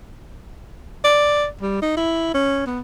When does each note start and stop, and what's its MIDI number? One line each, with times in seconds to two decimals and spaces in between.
1.04 1.46 74
1.62 1.79 55
1.82 1.95 63
1.97 2.31 64
2.34 2.63 61
2.66 2.80 59